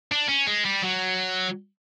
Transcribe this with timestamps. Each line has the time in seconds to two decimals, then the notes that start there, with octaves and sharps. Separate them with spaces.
0.11 D4
0.29 C#4
0.48 G#3
0.65 G3
0.83 F#3